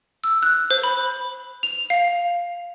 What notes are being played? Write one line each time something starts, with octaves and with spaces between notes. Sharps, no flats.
E6
F#6
C5
B5
F7
F5